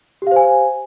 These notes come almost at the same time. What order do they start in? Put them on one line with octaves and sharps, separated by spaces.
G4 F5 C5 G#5